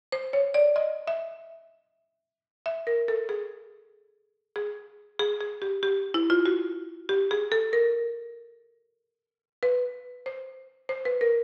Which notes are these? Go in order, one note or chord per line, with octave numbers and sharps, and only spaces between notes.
C5
C#5
D5
D#5
E5
E5
A#4
A4
G#4
G#4
G#4
G#4
G4
G4
E4
F4
F#4
G4
G#4
A4
A#4
B4
C5
C5
B4
A#4